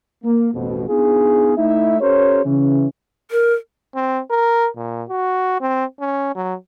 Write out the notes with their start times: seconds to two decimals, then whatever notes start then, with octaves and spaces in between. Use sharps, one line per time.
0.24 A#3
0.54 A1 F2 B2
0.88 B3 D4 D#4 F4 G#4
1.57 A3 D#4 E4 E5
2.00 C#4 F#4 G#4 A#4 C5 C#5
2.45 C#3 E3 C#4
3.31 A#4
3.95 C4
4.31 A#4
4.77 A#2
5.09 F#4
5.61 C4
6.00 C#4
6.35 F#3